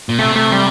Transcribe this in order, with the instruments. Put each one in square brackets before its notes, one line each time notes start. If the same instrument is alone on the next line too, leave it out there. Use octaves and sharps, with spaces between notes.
[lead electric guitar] A#2
[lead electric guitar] C3 [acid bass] A3
[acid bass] A3
G3